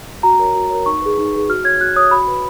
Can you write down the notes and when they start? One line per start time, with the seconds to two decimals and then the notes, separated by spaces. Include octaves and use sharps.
0.23 F#4 A#5
0.39 A#4 C#5
0.55 F#4
0.70 A#4 C#5
0.86 D#4 C#6
1.02 G#4 B4
1.18 D#4
1.33 G#4 B4
1.49 F#4 F6
1.64 C#5 G#6
1.81 F#4 F#6
1.96 C#5 D#6
2.11 F#4 B5
2.28 B4